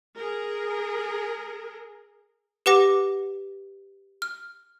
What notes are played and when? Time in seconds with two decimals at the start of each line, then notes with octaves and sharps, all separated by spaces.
0.16 G#4 A#4
2.66 G4 B4 F#5 D6 A#6
4.22 F6